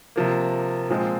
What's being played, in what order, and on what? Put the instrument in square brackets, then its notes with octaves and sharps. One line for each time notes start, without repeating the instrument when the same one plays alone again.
[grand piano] C3 F3 A#3
A#2 F3 G#3 C4